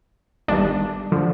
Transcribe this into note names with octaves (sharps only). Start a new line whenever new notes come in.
G1 G2 D#3 G3 D4
D3 F3